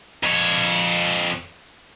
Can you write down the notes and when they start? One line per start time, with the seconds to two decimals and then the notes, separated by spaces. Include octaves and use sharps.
0.23 F2 C#5